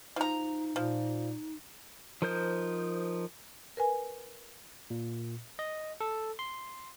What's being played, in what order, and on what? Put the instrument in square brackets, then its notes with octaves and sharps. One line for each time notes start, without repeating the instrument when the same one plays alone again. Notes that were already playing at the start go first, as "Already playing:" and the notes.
[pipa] F3 A#5 [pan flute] D#4
[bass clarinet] A#2 [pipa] F3
[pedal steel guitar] F3 D#4 A#4 C5 G6
[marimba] A#4 B4 G#5
[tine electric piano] A#2
D#5
A4
C6